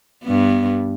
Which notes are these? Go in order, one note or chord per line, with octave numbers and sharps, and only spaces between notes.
G2 B3